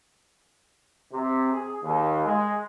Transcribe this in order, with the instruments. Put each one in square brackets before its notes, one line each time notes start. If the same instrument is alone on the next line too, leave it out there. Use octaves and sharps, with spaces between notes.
[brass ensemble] C3
G#4
D#2
G#3